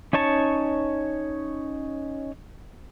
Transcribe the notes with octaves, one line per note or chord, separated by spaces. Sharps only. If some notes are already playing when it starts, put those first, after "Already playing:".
C#4 D#4 C#5 A5 C#6